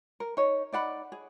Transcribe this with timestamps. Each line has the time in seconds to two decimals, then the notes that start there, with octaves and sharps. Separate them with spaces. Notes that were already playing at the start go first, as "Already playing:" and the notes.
0.20 A#4
0.37 D#4 C#5
0.72 D#4 D5 F#5 B5
1.12 G#4